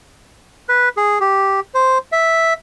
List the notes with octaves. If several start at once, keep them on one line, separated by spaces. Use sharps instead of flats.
B4
G#4
G4
C5
E5